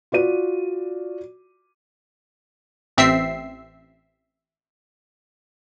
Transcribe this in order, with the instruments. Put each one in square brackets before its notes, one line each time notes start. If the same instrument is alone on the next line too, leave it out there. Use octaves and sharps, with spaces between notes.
[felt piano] F4 F#4 D5 D#7
[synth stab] A1 C4 E5 E6 C7